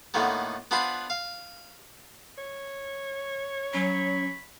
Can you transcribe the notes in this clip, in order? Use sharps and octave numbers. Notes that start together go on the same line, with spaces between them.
A2 D3 D#3 A#3 B3
B3 D4 F4 B4 C5
F5
C#5
F#3 C#4 B5